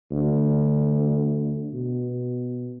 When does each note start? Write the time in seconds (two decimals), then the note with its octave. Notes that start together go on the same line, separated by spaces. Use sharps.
0.12 D2
1.73 B2